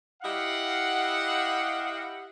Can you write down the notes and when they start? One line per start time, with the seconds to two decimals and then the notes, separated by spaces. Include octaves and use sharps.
0.23 E4 G4 D#5 F5 F#5